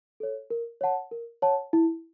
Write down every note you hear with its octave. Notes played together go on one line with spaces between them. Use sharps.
A4 C#5
A#4
C#5 F#5 A5
A#4
C#5 F#5 A5
E4